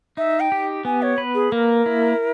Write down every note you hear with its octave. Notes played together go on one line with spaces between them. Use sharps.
D#4 E5
G5
G4
B3 G#5
C#5
B4
G#4
A#3 A#4
E4